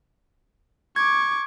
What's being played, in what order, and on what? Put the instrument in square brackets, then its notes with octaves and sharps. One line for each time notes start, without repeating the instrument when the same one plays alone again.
[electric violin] C#6 D6 [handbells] G#6